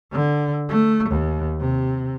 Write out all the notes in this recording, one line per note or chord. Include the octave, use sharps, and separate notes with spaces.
D3
A3
D#2
C3